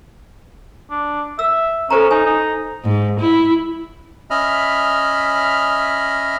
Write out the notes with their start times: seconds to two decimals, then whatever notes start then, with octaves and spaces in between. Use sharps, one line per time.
0.91 D4
1.39 E5 E6
1.90 C#4 A4 C5 A#5
2.11 D#4 G#5
2.26 D#4
2.84 G#2
3.19 E4
4.30 C#4 D#5 E5 B5 F6